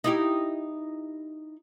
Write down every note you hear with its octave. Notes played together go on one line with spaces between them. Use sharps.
D#4 E4 G4